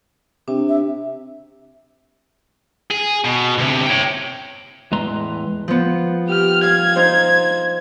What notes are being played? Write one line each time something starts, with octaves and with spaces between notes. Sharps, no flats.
C3 D4
E5
G#4
B2
D2 C3
C#5 G5
E2 A2 G#3 B4 A#5 C6
F3 B3
G4 F6
F5 G#6
D#4 C5